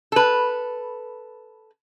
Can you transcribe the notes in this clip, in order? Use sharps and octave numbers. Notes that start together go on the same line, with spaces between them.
A4 B4